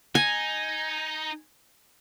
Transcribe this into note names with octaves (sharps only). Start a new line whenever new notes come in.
D#4 G#5